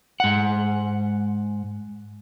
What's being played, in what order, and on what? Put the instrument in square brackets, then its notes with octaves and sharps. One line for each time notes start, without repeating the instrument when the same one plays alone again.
[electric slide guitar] G#2 F#5